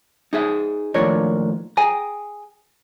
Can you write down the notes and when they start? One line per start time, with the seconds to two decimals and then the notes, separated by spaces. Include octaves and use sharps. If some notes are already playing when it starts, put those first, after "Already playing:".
0.33 D#4 G#4 E5
0.94 D#2 A2 F3 D4 A#4 C#5
1.77 G#4 G5 G#5 A#5